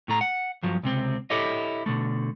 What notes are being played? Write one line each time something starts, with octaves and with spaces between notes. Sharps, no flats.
A2 A3 A#5
F#5
G2 F3 F#3
C#2 C3 C4
E4 G4 A4 C#5 D#5
B2 D3 A3